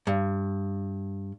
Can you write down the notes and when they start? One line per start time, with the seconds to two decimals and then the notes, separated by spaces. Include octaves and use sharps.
0.07 G2